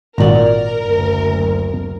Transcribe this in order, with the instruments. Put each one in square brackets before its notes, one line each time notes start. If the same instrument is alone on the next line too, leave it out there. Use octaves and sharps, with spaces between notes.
[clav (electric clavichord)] G#1 A#2 F#4 [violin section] A#4 [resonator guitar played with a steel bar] D5 A#5
[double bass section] F#1 D2